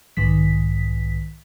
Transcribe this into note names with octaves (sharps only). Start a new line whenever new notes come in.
B1 G#2 D#3 B6